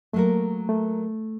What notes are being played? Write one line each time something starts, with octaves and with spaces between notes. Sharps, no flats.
F#3 A3 A#3 F#4 A#4
A3